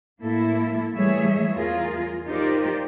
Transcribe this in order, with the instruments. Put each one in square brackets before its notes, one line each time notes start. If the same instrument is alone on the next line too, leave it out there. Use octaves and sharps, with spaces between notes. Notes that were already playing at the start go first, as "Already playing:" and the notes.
[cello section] A2 A#3 E4 A4 E5
E3 G3 A3 G#4 C#5 E5
E2 F4 G#4 A#4
D#4 F4 G4 A#4 C5 D5